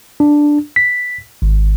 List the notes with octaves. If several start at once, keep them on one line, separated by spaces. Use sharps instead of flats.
D4
B6
G#1